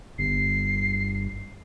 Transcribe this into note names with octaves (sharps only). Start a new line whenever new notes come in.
G1 C7